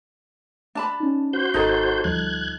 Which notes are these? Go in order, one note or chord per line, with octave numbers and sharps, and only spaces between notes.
D4 A5 B5
C#4 D#4
F#4 C5 G6
G#1 D#4 A4 A#4
D2 F3 G3 F#6 G#6